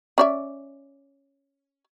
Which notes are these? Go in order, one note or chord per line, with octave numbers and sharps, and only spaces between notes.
C#4 D5 E5